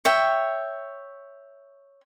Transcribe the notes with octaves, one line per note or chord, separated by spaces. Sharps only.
C#5 E5 G5